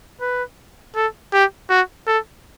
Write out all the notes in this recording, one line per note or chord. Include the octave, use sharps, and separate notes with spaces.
B4
A4
G4
F#4
A4